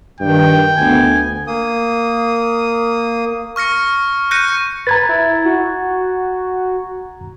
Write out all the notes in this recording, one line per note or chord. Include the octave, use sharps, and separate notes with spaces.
G2 D#3 G5
D2 B3 G#5
A#3 D#6
C#6 F6 A#6 C#7
F#6 G6 A#6 C#7 D#7
B4 A#5 G#6 A6
E4
F#4